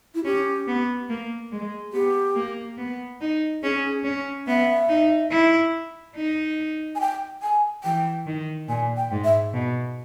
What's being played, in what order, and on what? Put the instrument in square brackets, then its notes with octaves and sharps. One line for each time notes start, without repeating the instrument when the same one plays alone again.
[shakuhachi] E4
[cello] C#4 [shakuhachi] G4
[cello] B3
A#3
G#3
[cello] B3 [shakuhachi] G4
[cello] A#3
B3
D#4
[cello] C#4 [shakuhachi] G#4
[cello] C#4
[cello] B3 [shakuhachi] E5
[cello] D#4
E4
D#4
[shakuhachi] G#5
G5
G#5
[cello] E3 [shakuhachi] G5
[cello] D#3
[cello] A#2 [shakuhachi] G#5
[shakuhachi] G5
[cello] G#2
[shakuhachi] E5
[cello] B2